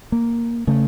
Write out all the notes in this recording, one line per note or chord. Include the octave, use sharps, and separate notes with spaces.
A#3
C#3 A3